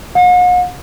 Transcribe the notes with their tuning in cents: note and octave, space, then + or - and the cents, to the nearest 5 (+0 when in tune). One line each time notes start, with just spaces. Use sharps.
F#5 -45